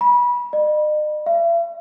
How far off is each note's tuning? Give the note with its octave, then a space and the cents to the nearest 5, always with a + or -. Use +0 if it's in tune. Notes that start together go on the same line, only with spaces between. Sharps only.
B5 -25
D#5 -45
E5 +45